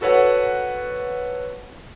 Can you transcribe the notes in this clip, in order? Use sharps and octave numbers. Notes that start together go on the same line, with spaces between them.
F#4 A4 B4 C#5 F#5